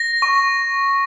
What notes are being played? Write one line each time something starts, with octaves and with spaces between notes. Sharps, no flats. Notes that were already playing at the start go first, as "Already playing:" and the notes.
Already playing: A#6
C#6